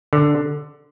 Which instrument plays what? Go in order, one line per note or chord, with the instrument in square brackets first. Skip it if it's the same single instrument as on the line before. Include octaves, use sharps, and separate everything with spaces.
[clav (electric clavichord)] D3